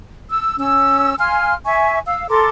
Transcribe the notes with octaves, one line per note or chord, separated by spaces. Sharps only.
E6
C#4 E6
F5 G#5 C6 F6
E5 G#5 C#6
F5 E6
A4 A#4 C6 D6